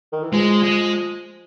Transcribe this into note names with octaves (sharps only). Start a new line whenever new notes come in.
D#3
E3
F3 G#3
G#3